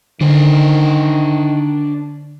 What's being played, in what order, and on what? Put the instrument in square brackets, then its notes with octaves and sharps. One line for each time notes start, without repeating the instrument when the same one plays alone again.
[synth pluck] D3 [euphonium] D#3 [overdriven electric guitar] D4 C5